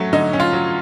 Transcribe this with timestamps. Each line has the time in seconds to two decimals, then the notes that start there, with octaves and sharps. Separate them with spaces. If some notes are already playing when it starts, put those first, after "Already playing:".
Already playing: F#3 A3 C#4
0.13 D3 D#4
0.33 C#4
0.40 F4
0.53 F#3